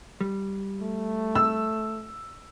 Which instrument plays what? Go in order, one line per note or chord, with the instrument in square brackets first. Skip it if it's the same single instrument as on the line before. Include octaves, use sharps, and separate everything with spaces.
[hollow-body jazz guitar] G3
[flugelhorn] A3
[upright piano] E6